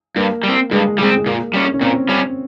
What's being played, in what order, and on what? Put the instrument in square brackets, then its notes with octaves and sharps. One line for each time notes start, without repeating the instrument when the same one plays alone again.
[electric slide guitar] G2 [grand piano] A#3
[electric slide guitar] G3
C4
[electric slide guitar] G2 [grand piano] G#3
[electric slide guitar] G3 [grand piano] G#3
[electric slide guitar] C4
[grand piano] G#3
[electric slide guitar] A#2 [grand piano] A#3
[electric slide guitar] G3 C#4
[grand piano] C#4
[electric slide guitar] A#2 [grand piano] C4
[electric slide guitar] G3 C#4